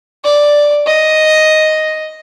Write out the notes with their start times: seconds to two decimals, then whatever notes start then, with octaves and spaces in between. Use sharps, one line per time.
0.24 D5
0.87 D#5